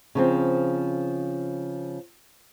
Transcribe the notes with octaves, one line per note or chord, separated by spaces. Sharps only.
C#3 F3 C4